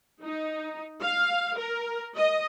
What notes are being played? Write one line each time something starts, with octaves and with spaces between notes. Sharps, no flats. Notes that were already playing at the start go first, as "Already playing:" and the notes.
D#4
F5
A#4
D#5